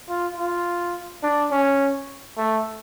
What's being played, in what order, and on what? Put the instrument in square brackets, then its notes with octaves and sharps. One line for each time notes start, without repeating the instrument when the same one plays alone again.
[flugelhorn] F4
F4
D4
C#4
A3